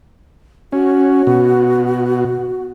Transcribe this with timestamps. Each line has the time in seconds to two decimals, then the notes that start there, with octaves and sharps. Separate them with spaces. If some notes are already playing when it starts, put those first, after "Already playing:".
0.72 C#4 F#4
1.27 B2